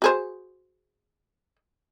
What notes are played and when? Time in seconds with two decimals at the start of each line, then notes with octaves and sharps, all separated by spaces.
0.02 F#4 G#4 C5